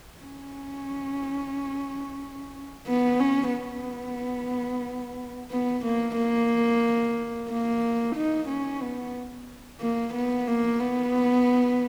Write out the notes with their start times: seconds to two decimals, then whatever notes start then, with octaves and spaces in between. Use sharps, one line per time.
0.23 C#4
2.87 B3
3.20 C#4
3.53 B3
5.51 B3
5.85 A#3
6.17 A#3
7.50 A#3
8.15 D#4
8.48 C#4
8.81 B3
9.80 A#3
10.14 B3
10.47 A#3
10.79 B3